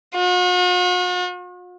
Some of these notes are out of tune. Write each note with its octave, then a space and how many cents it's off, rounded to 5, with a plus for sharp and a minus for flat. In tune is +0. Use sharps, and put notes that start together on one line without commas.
F#4 -45